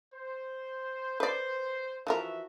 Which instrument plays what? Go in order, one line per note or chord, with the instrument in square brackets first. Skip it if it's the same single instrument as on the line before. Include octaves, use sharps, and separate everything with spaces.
[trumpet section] C5
[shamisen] B4 D5 [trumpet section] C5
[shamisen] E3 F3 A#4 [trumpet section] F#4 E5